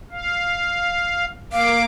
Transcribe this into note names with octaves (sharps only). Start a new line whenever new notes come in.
F5
A#3 F5 D6